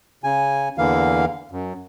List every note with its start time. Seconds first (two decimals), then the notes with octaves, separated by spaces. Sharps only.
0.24 C#3 G#5
0.78 E2 D3 E3 A#3 F5
1.52 F#2